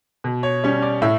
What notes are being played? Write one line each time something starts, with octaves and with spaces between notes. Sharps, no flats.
B2
C#5
G3 C#4 C#5
D5
A2 E5